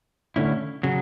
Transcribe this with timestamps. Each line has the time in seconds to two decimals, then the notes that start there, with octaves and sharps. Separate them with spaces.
0.36 D3 A3 C#4 E4
0.83 C#3 F#3